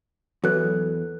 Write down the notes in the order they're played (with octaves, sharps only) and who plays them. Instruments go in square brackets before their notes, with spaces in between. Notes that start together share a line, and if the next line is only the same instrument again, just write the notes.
[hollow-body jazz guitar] E2 [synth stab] F#3 [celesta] A4 B4 F#6